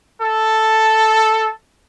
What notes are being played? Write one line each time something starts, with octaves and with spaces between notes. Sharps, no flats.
A4